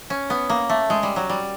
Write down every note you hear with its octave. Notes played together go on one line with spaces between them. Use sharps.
C#4
B3
A#3
A3
G#3
G3
F#3
G3